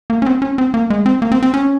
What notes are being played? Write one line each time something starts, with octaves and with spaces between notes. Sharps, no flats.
A#3
C#4
C4
C#4
C4
A#3
G#3
C4
A#3
C4
C4
C#4